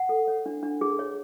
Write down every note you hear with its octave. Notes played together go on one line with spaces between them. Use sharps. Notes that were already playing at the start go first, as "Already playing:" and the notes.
Already playing: F#5
A4
C#5
D4
D4
G#4
C#5